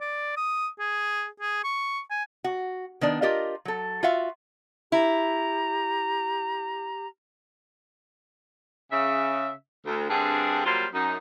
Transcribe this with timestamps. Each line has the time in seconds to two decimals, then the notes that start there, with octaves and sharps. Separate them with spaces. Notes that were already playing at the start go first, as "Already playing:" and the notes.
0.01 D5
0.37 D#6
0.79 G#4
1.40 G#4
1.64 C#6
2.10 G#5
2.44 F#4
3.01 D#3 B3 D4
3.22 F4 G4 A#4 D#5
3.65 F#3 A4
4.03 F4 F#4 E5 F5
4.92 E4 G4 A#5
8.92 C#3 E5
9.86 D2
10.09 G2 D3 C4 D4 G#4
10.65 F#3 G3 A#3 F4 C5
10.94 F#2 D#4